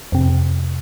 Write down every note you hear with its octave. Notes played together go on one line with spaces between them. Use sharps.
F2 C3